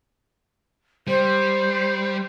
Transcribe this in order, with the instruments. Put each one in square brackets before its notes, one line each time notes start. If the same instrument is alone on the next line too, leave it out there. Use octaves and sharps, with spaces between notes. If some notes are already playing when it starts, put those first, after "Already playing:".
[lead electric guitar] G3 [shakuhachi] C5